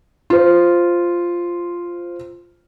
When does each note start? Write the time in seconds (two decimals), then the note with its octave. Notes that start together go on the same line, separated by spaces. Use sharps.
0.30 F4 C5